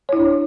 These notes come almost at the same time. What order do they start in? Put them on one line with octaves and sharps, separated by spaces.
C#5 E4 D4